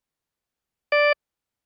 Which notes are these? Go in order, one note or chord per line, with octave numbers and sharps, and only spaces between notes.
D5